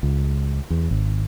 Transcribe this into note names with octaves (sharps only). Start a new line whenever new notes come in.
C#2
E2
G#1